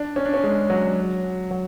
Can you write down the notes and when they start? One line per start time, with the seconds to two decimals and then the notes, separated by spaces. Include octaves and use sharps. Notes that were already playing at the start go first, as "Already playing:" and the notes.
Already playing: D4
0.16 C#4
0.26 D4
0.34 C#4
0.43 G#3
0.70 F#3
1.51 F#3